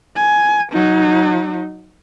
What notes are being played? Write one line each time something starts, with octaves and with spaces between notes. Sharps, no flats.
G#5
F#3 D#4